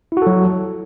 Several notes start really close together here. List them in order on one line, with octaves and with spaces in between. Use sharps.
E4 F#4 A4 F#3